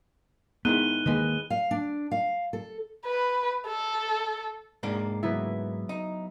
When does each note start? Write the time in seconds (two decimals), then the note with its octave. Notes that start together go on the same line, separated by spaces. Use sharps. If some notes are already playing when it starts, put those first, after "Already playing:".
0.65 G#2 D#3 E3 B3 F#6 D#7 G7
1.06 D#3 G#3 A#3 B4 D#5
1.50 F5
1.71 D4
2.12 F5
2.53 A4
3.06 B4
3.67 A4
4.83 G#2 A#3 D4
5.23 F#3 B3 E4
5.89 D#4